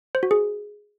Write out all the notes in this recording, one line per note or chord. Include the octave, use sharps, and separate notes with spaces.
C5
F#4
G#4